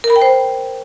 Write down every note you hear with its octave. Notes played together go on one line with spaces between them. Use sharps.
A#4
B5
G5
C5